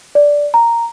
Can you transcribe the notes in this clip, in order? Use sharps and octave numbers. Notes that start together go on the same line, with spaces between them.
D5
A#5